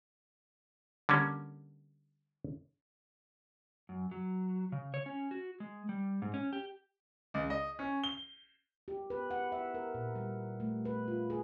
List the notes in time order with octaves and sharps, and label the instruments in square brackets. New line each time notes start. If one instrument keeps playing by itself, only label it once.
[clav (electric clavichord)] D3 G3 A#3 C#4
[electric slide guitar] F#2
F#3
C#3
C#5
C#4
F#4
G#3
G3
G#2
C#4
G4
[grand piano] C#2
D#5
C#4
G7
[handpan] G4
B4
F#5
E5
A#4
A#2
G3
A3
B4
F4
G#4